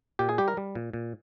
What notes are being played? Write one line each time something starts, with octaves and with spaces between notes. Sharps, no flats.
A#2 G4
G#4
G3 G4
A#4
G3
A#2
A#2